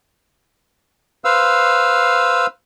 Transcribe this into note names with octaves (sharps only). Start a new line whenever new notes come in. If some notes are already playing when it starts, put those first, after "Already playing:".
B4 C5 F5 E6